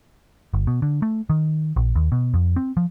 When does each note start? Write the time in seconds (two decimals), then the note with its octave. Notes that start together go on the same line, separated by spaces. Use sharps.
0.54 G1
0.67 B2
0.82 D3
1.02 A3
1.30 D#3
1.76 A#1
1.95 D#2
2.12 B2
2.34 F2
2.56 C4
2.77 F3